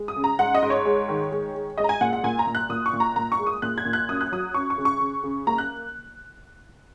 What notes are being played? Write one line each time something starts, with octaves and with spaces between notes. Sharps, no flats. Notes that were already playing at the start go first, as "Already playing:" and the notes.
Already playing: G#3
D#6
C#3
A#5
G#2 F#5
D#5
G#2
C#5
G#3
D#3
G#3
G#3
G#3 D#5
A#5
G#5
A#2 F#5
F#5
A#2 G#5
A#5
A#2
F#6
A#2 D#6
C#6
A#2
A#5
A#2 A#5
C#6
G#3
D#6
A#2 F#6
G#6
A#2
F#6
F#2 D#6
F#6
F#3 D#6
F#2 C#6
C#6
C#3
C#6
C#3
C#3
A#3 A#5
F#6